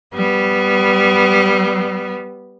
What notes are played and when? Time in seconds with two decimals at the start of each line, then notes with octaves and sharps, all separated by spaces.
0.14 G3 B3